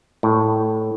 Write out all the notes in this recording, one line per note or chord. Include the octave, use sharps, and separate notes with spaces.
A2